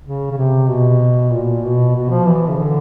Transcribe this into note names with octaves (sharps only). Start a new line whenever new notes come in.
C#3
C#3
C3
B2
A#2
B2
B2
F3
E3
C#3
D3